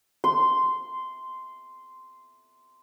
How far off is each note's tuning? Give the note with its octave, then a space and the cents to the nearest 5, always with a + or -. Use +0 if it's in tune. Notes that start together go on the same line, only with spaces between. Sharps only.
C6 -10